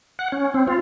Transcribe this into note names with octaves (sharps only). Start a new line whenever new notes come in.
F#5
C#4
C4
F4